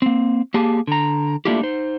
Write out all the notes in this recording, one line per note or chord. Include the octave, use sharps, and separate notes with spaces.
A#3 C4
A#3 G4 G#4 A5
D3 A#5
A3 A#3 D4 E4 F4 G4
D#4 C5